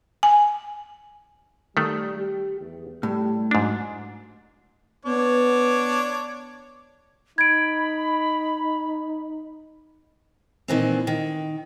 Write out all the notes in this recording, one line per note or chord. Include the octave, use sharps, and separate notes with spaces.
G#5
D#3 G3 A3
G4
E2
A2 G3
G#2 F#3 D4
B3 D4 C#5 D6
D#4 B5 G#6 D7
A#2 D#3 E3 C4
D#3